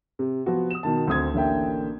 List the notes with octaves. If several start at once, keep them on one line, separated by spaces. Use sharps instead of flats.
C3
F3 B3 F#4
D#6 E7
B2 D#3 A5
D2 C4 D#6 G#6
A1 D3 A#3 E5 G5